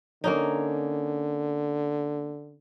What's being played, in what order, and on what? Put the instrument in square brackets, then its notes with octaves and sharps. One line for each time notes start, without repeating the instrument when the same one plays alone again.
[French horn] D3 [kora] A#3 C#4 D#4